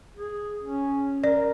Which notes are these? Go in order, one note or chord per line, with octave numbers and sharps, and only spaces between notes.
G#4
C#4
A#4 D5